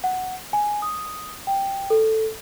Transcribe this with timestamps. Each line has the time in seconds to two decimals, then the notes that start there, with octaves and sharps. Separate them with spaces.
0.04 F#5
0.53 G#5
0.82 D#6
1.47 G5
1.90 A4